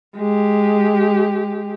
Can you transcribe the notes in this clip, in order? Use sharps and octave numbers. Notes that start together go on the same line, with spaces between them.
G#3 G4